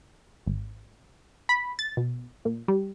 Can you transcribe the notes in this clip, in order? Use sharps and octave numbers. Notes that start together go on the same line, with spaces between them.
G#1
B5
A6
B2
A#2
G3